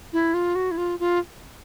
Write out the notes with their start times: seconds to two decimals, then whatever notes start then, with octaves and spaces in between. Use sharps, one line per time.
0.13 E4
0.34 F4
0.55 F#4
0.71 E4
0.77 F4
0.99 F4